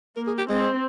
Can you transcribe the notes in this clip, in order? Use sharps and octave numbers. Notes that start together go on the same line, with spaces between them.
A#3 A#4
G#4
G4
G#3 C4